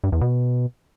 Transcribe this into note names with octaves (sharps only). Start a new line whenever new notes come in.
G2
E2
B2